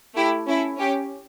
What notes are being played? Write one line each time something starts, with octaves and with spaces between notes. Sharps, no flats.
A3 E4 G4
C#4 E4 A4
C#4 G4